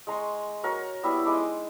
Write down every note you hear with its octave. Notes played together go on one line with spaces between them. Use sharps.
G#3 A#5 C6 C#6
F#4 A#4 C#5
G3 B3 E4 E5
G#3 D#4 C6 D6